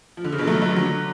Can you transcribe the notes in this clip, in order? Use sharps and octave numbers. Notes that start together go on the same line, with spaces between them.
F3
D3
C#3
B2 D3
F#3 A3
F#3 A3
D3 F#3